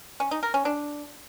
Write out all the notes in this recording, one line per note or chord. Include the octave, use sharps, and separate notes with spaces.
C#4
D#4
A#4
C#4
D4